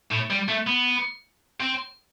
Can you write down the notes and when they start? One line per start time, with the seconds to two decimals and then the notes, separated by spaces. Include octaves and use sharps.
0.12 A2
0.31 G3
0.49 A3
0.67 B3
1.60 C4